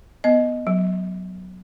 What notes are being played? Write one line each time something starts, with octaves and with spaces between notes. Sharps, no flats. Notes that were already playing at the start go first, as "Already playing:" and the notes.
B3 D#5
F#3